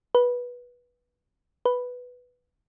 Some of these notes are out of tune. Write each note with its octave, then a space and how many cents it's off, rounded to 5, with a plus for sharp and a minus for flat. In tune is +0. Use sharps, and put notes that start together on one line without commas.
B4 -15
B4 +0